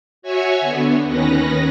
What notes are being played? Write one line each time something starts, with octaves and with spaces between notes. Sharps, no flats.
F#4 C#5 E5 G#5 C#6
D3 B3
D#2 D#3 C#4 B4 A#6